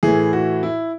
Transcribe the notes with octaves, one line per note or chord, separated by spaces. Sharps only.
A2 E3 G#4
F#4
E4